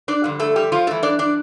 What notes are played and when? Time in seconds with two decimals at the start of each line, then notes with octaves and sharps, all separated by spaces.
0.08 D4 D5
0.24 G2 D3 F3
0.40 A3 A4
0.56 G3 G4
0.72 F3 F4
0.87 G2 E3 A3 A4
1.03 D4 D5
1.19 D4 D5